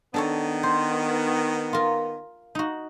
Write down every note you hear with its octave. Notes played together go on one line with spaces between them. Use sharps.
D#3 B3 D4 A4 C#5
C5
F4 A#4
D#4 F#4